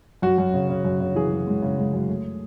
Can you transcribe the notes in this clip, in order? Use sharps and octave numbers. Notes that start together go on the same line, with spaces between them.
F#2 F#4
F#2
C#3
C#3
F#2
C#3
E3 G#4
F#2
G#3
C#3
G#3
F#2
A3